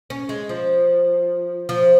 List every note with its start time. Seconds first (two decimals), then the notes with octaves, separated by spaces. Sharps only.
0.10 C#4
0.29 G#3
0.49 F3
1.69 F3